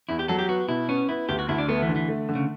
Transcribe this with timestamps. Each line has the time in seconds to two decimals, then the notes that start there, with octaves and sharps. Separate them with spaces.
0.09 E2 E4
0.19 G4
0.28 F#3 A4
0.39 G4
0.49 B3 F#4
0.68 B2 E4
0.89 B3 C#4
1.09 B3 E4
1.29 D2 G4
1.39 F#4
1.49 D2 E4
1.58 D4
1.68 A3 B3
1.82 E3
1.88 D3
1.96 E3
2.08 A3
2.29 D3
2.35 C#3